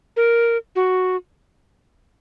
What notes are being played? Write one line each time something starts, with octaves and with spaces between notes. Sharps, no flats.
A#4
F#4